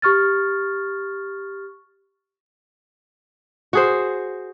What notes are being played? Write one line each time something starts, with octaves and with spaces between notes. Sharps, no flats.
G4 C#6 F6 A6
F#4 G#4 C5